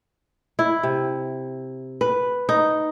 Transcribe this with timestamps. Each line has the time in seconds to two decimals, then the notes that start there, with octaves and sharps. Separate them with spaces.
0.59 E4
0.83 C3
2.01 B4
2.49 D#4